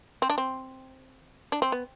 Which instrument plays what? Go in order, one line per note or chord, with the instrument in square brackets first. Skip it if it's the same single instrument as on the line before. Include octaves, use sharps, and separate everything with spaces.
[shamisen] C4
D4
C4
D4
C4
B3